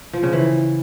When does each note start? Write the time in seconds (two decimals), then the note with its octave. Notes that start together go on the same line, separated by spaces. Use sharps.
0.13 F3
0.23 C#3
0.33 E3